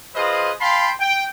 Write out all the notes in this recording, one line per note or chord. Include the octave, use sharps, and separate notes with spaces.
F4 G#4 B4 C5 D#5 F5
F5 G5 A5 B5 C6
G5